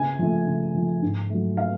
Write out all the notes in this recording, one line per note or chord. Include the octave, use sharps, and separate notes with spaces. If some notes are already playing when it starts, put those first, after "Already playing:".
Already playing: C#3 G#5
F3 A3
C#3
F3 A3
G#2
F#3 A3
F5